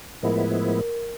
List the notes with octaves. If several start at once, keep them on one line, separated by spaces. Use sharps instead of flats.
A2 F3 G#3 B3 E4 A#4